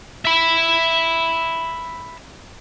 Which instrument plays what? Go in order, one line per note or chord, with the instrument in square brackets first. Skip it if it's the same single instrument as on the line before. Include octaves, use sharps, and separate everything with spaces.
[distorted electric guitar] E5 B5